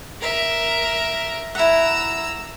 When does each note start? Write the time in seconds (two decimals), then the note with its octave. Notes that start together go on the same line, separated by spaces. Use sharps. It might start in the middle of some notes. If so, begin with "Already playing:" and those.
0.21 A#4 E5
1.55 E4 F#5 A#5 E6